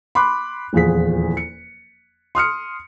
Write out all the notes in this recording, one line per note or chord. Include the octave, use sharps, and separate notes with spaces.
B5 C6 D6 F#6
D#1 E2 F3 G#4 B6
C#7
C6 D#6 F6 C#7